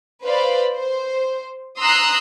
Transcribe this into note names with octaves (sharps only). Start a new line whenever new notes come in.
B4 C5 D5 F5 B5
C5
A#5 C6 D#6 E6 F#6 C7